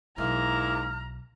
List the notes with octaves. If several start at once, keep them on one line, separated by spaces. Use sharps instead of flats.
B1 G#2 A#3 E4 A#5 F6